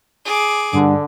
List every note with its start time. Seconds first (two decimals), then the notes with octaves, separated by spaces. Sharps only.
0.25 G#4 D6
0.73 G2 D3